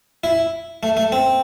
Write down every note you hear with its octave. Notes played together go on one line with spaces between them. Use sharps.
E4
A3
A3
C4